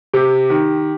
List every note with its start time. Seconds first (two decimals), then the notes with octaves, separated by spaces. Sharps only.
0.13 C3 G4
0.50 D#3